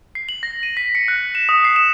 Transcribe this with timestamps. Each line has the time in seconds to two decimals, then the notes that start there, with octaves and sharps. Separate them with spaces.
0.15 C7
0.29 F#7
0.43 A#6
0.63 D#7
0.77 B6
0.95 C#7
1.08 F#6
1.35 E7
1.49 D#6
1.65 C7
1.76 E7